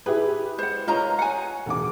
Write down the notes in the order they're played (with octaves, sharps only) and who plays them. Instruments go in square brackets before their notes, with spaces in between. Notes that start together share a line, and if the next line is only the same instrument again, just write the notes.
[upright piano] E4 G4 B4 [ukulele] G#4
[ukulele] C5 F#5
[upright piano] F4 C#5 [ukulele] A#4 D#5 A#5
[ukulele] F#5 G#5
[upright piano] E1 A1 D6